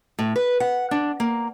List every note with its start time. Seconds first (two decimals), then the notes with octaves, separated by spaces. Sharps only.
0.19 A2
0.36 B4
0.60 F#5
0.91 D4
1.20 A#3